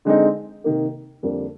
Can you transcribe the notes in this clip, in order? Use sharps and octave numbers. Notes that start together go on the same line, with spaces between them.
D3 G#3 C4 D#4
C3 D#3 A#3
F2 D3 G3 A#3 D4